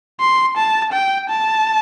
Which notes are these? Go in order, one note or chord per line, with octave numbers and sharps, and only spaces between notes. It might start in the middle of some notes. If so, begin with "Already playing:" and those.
C6
A5
G5
A5